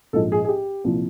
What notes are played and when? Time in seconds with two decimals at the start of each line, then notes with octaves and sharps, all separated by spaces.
0.13 A#1 G#2 F3 A4
0.32 G#4
0.45 G#4
0.49 G4
0.84 C2 A#2 F3